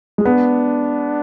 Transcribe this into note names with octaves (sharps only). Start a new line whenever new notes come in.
G#3
B3 D4